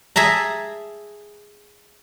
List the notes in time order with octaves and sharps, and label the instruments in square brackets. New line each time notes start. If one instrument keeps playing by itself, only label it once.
[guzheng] G#4 E5 A5 A#5